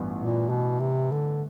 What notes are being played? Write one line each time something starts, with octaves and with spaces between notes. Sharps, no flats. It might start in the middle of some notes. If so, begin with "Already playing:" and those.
Already playing: A1 G2 E3 B3
A#2
B2
C3
D3